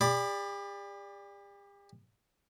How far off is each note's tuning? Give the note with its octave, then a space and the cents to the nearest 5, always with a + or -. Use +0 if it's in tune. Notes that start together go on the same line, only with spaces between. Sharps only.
G4 +45 D5 +0 B5 +0